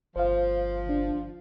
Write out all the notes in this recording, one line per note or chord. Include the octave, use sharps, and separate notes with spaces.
G1 F3 C5 F5
D4